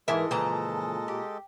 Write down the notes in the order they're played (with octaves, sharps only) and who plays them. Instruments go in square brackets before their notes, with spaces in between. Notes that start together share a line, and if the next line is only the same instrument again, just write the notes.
[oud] G#2 E3 E5 [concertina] G#3 A4 D#5 [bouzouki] A#4
[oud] F2 C#3 E3 [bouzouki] A#2 A5 A#5
[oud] G4